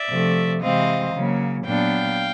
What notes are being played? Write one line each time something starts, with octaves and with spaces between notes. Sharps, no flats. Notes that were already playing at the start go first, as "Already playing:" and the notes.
Already playing: D5 E5
C3 F3 A3
C3 E3 G#3 C4 D#5 F5
C#3 F#3 A#3
A#2 F#3 B3 D4 F5 G5